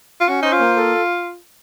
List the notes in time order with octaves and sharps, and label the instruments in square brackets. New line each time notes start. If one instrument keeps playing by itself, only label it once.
[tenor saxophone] F4
[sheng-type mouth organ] C#4 [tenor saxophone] F#4
[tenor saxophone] D#4 [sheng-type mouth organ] C5
[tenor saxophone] F4
[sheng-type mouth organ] A#3
A4